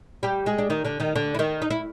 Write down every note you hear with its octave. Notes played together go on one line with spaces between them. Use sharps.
G3 G4
G#3 G#4
D4
D#3 D#4
D3 D4
D#3 D#4
D3 D4
E4
D#3 D#4
D#4
E4